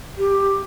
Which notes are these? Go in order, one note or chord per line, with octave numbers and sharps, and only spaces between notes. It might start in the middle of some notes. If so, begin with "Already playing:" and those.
G4